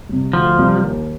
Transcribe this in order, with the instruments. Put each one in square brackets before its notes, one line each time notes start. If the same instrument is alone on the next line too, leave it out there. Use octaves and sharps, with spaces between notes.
[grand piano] C3 G3
[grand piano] D2 [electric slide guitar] F3
[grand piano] C3 G3
D#2